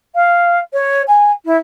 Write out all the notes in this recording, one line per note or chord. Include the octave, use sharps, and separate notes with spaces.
F5
C#5
G#5
E4